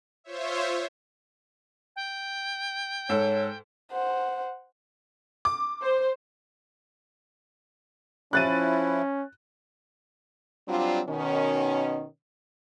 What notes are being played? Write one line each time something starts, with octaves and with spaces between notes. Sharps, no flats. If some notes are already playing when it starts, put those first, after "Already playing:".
F4 C5 C#5 E5
G5
G#2 A4 C#5
C5 F#5
D6
C5
F3 C#4 E4 F#6 A6 D#7
F#3 G3 C4 D4 F4
B2 D#3 C#4